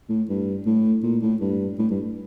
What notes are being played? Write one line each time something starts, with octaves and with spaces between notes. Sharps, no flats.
A2
G2
A2
A#2
A2
G2
A2
G2